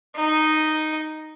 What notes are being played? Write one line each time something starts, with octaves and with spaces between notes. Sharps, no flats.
D#4